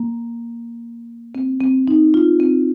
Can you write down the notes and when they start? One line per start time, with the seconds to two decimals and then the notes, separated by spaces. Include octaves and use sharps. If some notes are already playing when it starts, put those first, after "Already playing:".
Already playing: A#3
1.35 C4
1.60 C4
1.88 D#4
2.14 F4
2.40 C4